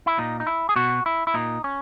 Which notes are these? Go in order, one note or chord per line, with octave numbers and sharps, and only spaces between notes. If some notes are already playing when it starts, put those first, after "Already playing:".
E4
A#2 D#4
D#4
E4
G#4
B2 F#4
E4
E4
A#2 D#4
C#4